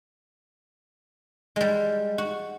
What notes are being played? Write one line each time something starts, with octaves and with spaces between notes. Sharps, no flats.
G3 G#3
F#4